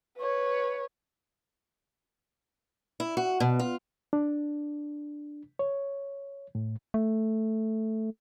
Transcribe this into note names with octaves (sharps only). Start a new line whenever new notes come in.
B4 C#5
E4
F#4
B2
F4
D4
C#5
A2
A3